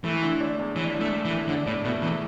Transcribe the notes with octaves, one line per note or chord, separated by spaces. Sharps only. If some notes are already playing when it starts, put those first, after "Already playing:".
E3 A3
D3
D4
E2
E3 D4
D4
A3
A3
E3
A3
D3 D4
A2 D4
B2 A3
E2 E3